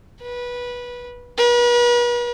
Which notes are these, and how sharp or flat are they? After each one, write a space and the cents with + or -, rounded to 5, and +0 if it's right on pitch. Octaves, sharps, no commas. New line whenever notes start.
B4 -20
B4 -40